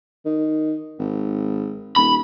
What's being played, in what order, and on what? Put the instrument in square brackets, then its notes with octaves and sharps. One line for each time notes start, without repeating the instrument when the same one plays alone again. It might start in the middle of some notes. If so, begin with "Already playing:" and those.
[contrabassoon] D#3
G#1
[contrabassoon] D#1 [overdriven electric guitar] B5